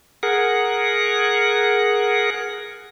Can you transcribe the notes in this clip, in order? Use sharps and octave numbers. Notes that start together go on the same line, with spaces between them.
G#4 A#4 F#5